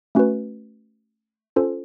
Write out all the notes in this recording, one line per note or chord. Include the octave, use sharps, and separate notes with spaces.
A3 C#4 F#4 B4
C#4 F4 A4 C5